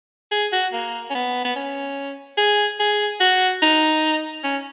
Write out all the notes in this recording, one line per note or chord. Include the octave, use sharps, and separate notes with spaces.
G#4
F#4
A#3
C#4
B3
B3
C#4
G#4
G#4
F#4
D#4
C#4